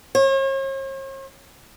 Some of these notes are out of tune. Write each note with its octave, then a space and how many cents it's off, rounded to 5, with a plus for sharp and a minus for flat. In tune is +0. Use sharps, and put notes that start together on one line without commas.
C#5 -45